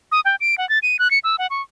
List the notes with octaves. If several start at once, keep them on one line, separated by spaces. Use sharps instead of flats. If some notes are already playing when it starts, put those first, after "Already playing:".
D#6
G5
D7
F#5
A6
D#7
F#6
C#7
E6
F#5
C#6